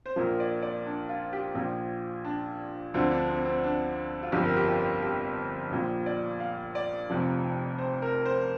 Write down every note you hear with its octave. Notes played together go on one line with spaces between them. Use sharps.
C5
A#1 A#2 F3 A#4
D5
D5
D4
F4
G4
A#1 A#2 F3 F4
D4
D2 D3 F3 C4
D4
C4
C4
D4
F4
G1 F2 F3 G4
A#4
G4
F4
G4
A#1 A#2 F3
D5
F5
D5
F1 F2 C3 F3
C5
A#4
C5